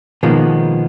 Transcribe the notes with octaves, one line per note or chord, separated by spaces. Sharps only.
B2 D#3 F3 G#3 A#3 B3